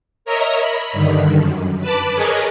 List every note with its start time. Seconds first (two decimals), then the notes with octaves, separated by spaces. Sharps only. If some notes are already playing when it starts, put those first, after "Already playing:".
0.25 A#4 C#5 D#5 E5 A#5
0.58 B5
0.93 G2 D3 D#3
1.38 F#2
1.81 B4 A5 B5 D6
2.15 G#4 A#4 B4 C#5 D#5 G#5